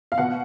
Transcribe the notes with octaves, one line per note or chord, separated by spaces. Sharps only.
F5
B2 F#5